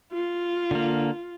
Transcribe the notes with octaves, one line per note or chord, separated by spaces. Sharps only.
F4
D3 A#3